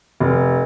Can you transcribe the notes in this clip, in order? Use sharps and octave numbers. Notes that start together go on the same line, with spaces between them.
F1